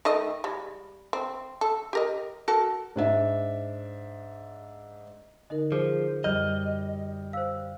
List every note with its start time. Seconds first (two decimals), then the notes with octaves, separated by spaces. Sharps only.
0.05 D#3 A3 D#5
0.44 G3 G#3
1.13 C4
1.61 A4
1.93 G4 A#4 D#5
2.48 F#4 A4 A#4
2.96 G#2 D4 E5
5.50 D3 D#4 A#4 D#5
5.72 F3 G#4 C5
6.24 F#2 G3 D#5 F6 G6
7.33 C5 F5 E6